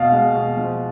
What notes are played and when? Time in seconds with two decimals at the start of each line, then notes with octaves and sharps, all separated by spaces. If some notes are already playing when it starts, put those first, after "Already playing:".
Already playing: B2 F5
0.12 G#3
0.35 B2
0.57 F3